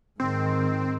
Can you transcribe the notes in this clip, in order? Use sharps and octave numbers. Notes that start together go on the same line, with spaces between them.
G#2 D#3 C4